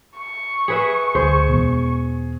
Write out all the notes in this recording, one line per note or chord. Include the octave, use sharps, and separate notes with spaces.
C#6
G#4 B4 E5
D2 G#4 C5
E2 B2